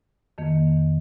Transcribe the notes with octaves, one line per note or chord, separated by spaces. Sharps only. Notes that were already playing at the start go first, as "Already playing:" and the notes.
F2 D#3 A#3